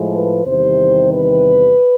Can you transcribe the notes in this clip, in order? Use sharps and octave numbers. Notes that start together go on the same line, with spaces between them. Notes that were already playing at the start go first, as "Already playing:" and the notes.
Already playing: A2 F3 G#3
B4
E2 C3 D#3 G3 C5
B4